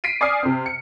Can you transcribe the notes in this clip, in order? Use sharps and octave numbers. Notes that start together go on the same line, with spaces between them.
B6 C7 D7 D#7
D5 G#5 D#6 F6 C7
C3 C4
C#7